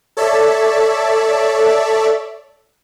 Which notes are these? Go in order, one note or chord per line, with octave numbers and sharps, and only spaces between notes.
A4 C#5 D5 E5